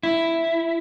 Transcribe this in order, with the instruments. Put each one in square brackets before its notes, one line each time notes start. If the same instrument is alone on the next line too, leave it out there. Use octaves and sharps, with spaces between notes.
[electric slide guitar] E4